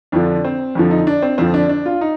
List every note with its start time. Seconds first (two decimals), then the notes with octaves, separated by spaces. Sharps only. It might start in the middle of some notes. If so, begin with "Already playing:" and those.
0.12 F2 D3 F3 D4
0.45 C4
0.75 F2 D3 F3
0.91 D#4
1.07 D4
1.22 C4
1.38 F2 D3 F3 C4
1.54 D4
1.69 D4
1.86 F4
2.01 D#4